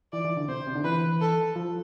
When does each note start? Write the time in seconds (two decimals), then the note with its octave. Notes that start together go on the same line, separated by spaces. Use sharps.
0.13 E3 D5
0.25 E3
0.37 D3
0.48 C3 C5
0.67 C3
0.75 D3
0.84 E3 B4
1.21 A4
1.56 F3